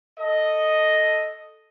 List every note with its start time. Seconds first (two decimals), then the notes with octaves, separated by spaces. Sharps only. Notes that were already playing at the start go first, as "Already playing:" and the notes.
0.19 A4 D#5